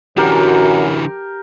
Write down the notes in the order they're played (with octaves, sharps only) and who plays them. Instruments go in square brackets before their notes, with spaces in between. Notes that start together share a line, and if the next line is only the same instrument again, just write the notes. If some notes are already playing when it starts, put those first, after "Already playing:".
[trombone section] F#2 [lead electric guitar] D3 E3 [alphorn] F#4 [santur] G4 A#4